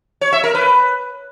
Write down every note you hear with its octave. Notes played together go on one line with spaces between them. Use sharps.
C#5
E5
A#4
B4